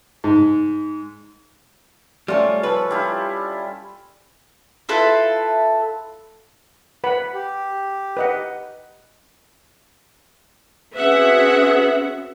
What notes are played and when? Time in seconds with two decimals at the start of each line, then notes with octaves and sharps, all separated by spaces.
0.24 G#2
2.28 G3 A3 C#4 F4
2.63 F3 A4 B4
2.91 G3 E4 F4
4.89 E4 F4 A4 B4
7.04 B4 F#5 B5
7.34 G4
8.17 B4 D#5 F#5
10.96 C4 C#4 F#4 G#4 B4 E5 F#5